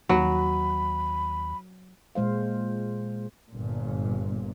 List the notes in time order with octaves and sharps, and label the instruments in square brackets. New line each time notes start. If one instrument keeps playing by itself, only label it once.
[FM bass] D#2 [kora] F#3 [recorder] B5
[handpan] A#2 G#3 C5 F5
[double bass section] G1 A#2